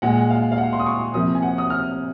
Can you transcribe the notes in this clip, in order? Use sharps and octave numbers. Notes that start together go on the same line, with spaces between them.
A#2 G#3 F#5
F5
F5
F#5
C6
D#6
C#6
C3 F3 A#3 D#6
G#5
F#5
D#6
F6